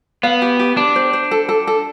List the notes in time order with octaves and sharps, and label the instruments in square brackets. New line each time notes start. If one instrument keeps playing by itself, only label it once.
[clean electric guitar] B3 [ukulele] F5
[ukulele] G4
G4
[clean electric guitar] D4 [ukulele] G4
[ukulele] C5
C5
A4
A4
A4